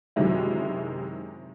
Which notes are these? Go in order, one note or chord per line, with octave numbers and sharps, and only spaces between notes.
F#2 C3 D#3 F#3 G#3 E4